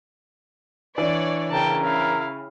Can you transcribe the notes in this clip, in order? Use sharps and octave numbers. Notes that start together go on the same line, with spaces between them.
E3 D4 C#5 D5
C#3 A#4 G5 A5
E4 F5